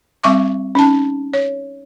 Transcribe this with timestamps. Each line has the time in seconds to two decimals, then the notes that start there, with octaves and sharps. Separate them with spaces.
0.23 G3 C4 E5 C#6 D6
0.75 C#4 D#4 A5
1.34 C#5